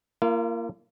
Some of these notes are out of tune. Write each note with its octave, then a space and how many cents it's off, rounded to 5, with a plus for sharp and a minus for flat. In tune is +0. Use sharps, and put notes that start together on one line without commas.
A#3 -10 F4 -45